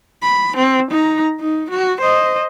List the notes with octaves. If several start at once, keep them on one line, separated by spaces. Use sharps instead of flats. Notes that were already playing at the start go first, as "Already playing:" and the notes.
B5
C4
D#4 A#5
D#4
F#4
C5 D#5